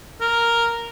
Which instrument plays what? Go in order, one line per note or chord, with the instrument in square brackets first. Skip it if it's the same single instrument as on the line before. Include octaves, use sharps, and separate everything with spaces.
[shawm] A#4